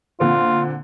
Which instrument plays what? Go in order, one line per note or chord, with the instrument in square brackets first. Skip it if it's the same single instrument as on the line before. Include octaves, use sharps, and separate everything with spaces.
[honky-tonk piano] A#2 D3 C4 [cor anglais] F4